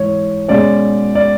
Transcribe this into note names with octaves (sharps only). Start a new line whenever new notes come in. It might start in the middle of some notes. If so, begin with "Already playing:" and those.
Already playing: G#2 E3 G#3 C#5
B2 G#3 C#4 D5
D5